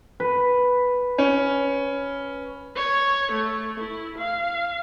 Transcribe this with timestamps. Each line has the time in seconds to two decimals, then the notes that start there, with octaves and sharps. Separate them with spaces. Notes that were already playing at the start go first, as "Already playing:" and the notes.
0.20 B4
1.18 C#4
2.76 C#5
3.31 A3
3.80 E4
4.18 F5